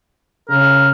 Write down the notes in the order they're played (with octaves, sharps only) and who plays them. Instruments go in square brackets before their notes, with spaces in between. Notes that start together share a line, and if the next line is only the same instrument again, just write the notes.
[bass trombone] C#3 [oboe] A#4